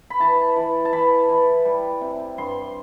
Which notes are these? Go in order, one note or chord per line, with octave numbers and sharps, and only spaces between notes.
B5
E3 A5
E3
A5
E3 B5
E3
G3
C3
G2 C6